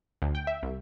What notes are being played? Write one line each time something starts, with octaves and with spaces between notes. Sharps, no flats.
D2
G5
E5
C2